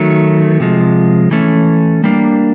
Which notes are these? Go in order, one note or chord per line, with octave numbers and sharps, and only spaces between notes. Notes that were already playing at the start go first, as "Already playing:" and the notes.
Already playing: D#3 F#3 A3
C3 F3 G#3
E3 A3 C#4
G3 A#3 D4